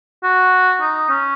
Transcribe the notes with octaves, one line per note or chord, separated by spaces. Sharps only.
F#4
D#4
C#4